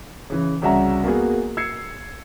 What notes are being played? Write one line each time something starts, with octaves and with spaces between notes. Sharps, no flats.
C#3 E3
C2 C#3 F#4 E5 F#5 A#5
A#3 B3 F#4 G#4
E6 G#6 C7 C#7